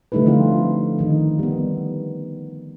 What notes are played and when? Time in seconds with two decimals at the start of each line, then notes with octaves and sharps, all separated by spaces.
0.12 D3 G3 A3 D#4 E4 B4
0.26 F3 A3 C4 F4
0.99 D#3 D#4
1.39 G3 B3